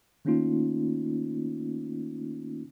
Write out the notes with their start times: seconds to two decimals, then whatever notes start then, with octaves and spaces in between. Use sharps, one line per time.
0.25 D#3 A3 A#3 C#4 D#4 F4